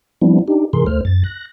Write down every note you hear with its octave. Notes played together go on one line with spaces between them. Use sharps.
F3 G3 B3 C4 D4 E4
D4 D#4 G4
G#2 C3 E3 G#4 A#4 C6
D2 A3 C5 F6
F#2 A6
F#6 A#6